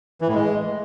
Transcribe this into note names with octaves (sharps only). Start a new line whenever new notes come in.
E3
A2
G#3